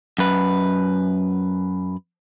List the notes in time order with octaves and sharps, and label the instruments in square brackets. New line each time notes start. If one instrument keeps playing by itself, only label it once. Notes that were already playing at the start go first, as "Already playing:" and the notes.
[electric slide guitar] F#2 B4